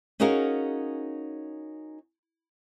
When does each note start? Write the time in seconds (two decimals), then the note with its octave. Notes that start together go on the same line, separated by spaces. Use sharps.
0.20 C#4 D#4 F#4 G#4 A#4 F5